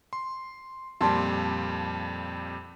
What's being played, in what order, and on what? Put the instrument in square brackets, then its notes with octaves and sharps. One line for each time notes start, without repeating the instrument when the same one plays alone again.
[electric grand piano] C6
[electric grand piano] F2 A#2 G3 [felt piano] A5 C6